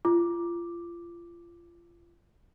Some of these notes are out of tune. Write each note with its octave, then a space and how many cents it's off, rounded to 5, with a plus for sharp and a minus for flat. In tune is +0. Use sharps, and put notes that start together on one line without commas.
F4 -30 D6 +0